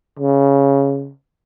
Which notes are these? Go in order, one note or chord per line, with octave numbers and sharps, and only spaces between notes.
C#3